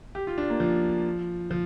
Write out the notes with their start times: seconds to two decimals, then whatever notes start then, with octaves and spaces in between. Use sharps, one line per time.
0.15 G4
0.27 F4
0.38 D4
0.50 A#3
0.60 F3
1.51 F3